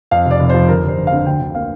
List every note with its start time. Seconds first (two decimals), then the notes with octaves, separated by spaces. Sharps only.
0.11 F2 F5
0.25 F1
0.31 D5
0.40 F1
0.50 F3 C5
0.68 G1 A#4
0.84 G1 C5
0.98 G1
1.07 F5
1.12 D3
1.26 D2 G5
1.40 D2
1.55 A#3 F5